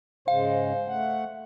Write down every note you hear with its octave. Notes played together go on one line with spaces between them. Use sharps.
G#2 C#3 G#3 C5 F5
A3 F#5